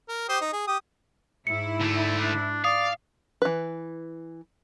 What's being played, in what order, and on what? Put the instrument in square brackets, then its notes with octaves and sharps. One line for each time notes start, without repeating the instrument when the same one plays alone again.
[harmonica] A#4
G4 C5 D#6
D#4
G#4
G4 D#6
[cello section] G#2 E4 [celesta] C#7
[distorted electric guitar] D3 A3
[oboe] D4
[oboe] D5 [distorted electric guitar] F5 [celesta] D#6
[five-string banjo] E3 B4